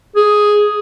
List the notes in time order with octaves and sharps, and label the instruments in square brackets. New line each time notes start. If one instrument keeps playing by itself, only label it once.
[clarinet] G#4